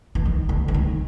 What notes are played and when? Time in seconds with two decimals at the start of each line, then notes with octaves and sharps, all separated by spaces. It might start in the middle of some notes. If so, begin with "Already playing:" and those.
0.15 E3
0.25 D#3
0.49 D3
0.68 E3
0.74 D#3